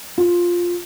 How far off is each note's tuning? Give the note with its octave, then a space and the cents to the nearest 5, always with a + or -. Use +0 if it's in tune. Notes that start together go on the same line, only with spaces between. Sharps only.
F4 +5